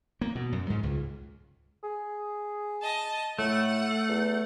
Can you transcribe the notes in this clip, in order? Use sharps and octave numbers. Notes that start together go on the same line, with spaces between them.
A#3
B2
F#2
G#2
C#2
G#4
D#5 A5
A2 A3 F#5
E2